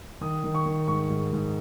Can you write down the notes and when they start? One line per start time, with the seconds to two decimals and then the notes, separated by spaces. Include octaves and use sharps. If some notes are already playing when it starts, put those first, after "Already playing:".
0.21 D#3 D#6
0.44 D#3
0.54 C#6
0.66 D#3
0.88 G#2 C#6
1.10 G#2
1.33 G#2